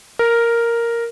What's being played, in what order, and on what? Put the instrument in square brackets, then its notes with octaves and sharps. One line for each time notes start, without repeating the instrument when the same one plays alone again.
[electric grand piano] A#4